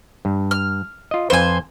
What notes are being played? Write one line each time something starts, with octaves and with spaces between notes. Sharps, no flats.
G2
F6
F4 D#5
F2 F4 B4 C5 G#5